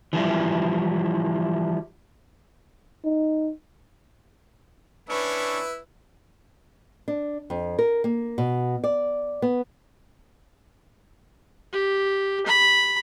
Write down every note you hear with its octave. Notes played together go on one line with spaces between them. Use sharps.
E3 F3 G3 E4
D#4
C#4 D4 E4 B4 C#6 E6
D4
F2
A#4
A#3
B2
D5
B3
G4
B5